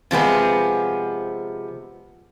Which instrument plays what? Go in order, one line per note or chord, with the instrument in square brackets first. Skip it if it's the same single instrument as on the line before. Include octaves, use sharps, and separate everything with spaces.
[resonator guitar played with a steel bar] C3 F3 G#3 B3